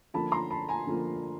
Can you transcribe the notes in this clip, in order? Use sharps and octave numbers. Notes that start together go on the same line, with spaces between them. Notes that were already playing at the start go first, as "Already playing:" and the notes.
D3 F3 A#3 A5 B5
A#5 C6
A5 B5
G#5 A#5
D3 F3 A#3